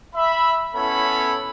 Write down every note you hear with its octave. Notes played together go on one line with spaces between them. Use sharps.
E5 B5
B3 C#4 E4 A4 C#5 B5